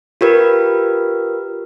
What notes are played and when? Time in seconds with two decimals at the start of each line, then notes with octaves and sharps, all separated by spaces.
0.21 F4 G4 A#4 B4